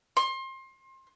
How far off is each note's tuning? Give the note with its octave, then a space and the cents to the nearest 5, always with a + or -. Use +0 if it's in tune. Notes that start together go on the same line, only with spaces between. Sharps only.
C6 +30